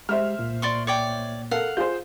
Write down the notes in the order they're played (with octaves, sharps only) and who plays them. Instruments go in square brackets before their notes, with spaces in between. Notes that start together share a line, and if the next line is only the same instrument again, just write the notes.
[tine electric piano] G#3 G4 [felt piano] C5 E5 F6
[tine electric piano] C2 A#2 A#3
[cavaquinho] D5 C6 C#6
C#5 D5 G5
[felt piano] A4 A#4 [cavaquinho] F5 F#5
[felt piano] F4 G#4 C5 [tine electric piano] G6